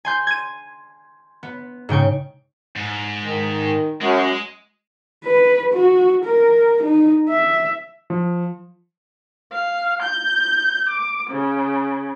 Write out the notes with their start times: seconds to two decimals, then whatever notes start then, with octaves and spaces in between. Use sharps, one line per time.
0.05 G#5 C6 G6
0.27 G#6 D#7
1.43 B3
1.89 G#2 C#3 G5 C#6
2.76 G#2
3.24 D#3
4.01 F#2 G#3
5.25 B4
5.74 F#4
6.26 A#4
6.84 D#4
7.29 E5
8.10 F3
9.52 F5
10.04 G6
10.90 D6
11.30 C#3